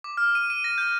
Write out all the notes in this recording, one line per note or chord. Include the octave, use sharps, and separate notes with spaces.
D6
F6
D#7
D#7
A#6
G6